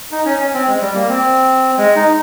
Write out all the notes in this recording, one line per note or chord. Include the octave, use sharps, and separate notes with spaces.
D#4
C#4
C#4
C4
G#3
G3
A#3
C4
G#3
D#4